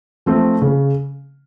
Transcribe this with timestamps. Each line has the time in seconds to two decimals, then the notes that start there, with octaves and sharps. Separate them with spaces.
0.26 F3 A3 C4
0.62 C#3